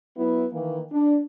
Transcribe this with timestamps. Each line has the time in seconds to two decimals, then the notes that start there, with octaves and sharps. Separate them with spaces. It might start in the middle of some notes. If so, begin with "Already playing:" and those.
0.17 F#3 B3 E4
0.53 D#3 E3 A#3
0.92 D4